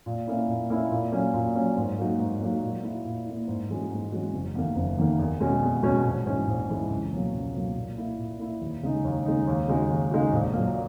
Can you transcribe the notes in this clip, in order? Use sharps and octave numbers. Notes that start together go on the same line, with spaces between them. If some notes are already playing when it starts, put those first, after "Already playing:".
A#2
A#3 C#4 E4
A#2
A#3 C#4 E4
A#2
F#3 A#3 C#4
A#2
F#3 A#3 C#4
G#2
F#3 A#3 D#4 F#4
G#2
F#3 A#3 D#4 F#4
A#2
A#3 E4
A#2
A#3 E4
G#2
E3 G#3 C#4 F#4
G#2
E3 G#3 C#4 F#4
F#1
E2 D#3 A#3
F#1
E2 D#3 A#3
E2
B2 G#3 C#4 F#4
E2
B2 G#3 C#4 F#4
A#1
G#2 E3 G#3 C#4
A#1
G#2 E3 G#3 C#4
C#2
B2 F#3 A#3
C#2
B2 F#3 A#3
A#2
A#3 E4
A#2
A#3 E4
D#2
C#3 G#3 D#4
D#2
C#3 G#3 D#4
D#2
C#3 G#3 D#4 F#4
D#2
C#3 G#3 D#4 F#4
A#1
A#2 F#3 A#3